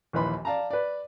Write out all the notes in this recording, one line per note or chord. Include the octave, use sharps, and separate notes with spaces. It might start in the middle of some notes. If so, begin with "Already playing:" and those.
A#1 D#2 E3 B4 B5 C6
D5 F5 A5 A#5
B4 D5